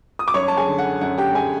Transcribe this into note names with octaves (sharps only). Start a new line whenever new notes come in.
D#6
D6
F#2 C#5 C#6
A5
G#4 G#5
D3
F#5
F#2 F#5
G4 G5
F#2 G#4 G#5